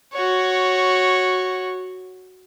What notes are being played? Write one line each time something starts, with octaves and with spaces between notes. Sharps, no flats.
F#4 C#5